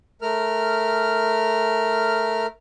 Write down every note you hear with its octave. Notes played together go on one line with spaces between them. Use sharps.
A3 A#4 F6